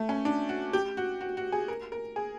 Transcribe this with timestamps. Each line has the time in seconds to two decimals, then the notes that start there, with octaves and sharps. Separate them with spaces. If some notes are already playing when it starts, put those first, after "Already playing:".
Already playing: A3
0.09 C#4
0.25 D4
0.49 F#4
0.73 G4
0.97 F#4
1.21 F#4
1.37 F#4
1.52 G#4
1.68 A#4
1.92 A#4
2.16 G#4